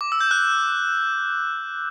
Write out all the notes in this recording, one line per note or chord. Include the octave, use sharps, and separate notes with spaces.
D6
E6
G6
F#6